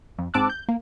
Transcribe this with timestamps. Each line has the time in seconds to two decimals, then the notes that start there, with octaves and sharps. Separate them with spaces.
0.18 F2
0.34 G#2 C4 A5 D6 E6 F#6
0.49 G6
0.68 A#3